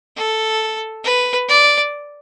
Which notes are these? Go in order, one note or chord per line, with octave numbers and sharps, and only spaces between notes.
A4
B4
D5